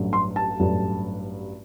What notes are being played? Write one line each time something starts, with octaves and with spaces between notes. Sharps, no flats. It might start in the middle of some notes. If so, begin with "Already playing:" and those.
Already playing: A1 G2 F#3 A3 D4
C6
A5
A1 G2 F#3 A3 D4